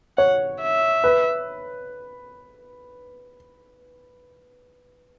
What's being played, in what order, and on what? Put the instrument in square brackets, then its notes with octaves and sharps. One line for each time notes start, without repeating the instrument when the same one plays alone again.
[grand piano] C#5 [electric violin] F#5
[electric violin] E5
[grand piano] B4